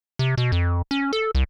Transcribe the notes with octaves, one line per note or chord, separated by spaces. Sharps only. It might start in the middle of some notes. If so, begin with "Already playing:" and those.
C3
B2
F2
C#4
A4
C2